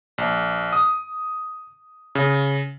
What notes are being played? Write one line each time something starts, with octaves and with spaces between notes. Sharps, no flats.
A#1
D#6
C#3